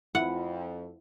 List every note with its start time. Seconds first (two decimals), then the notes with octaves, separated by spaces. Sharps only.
0.15 F2 E4 F#5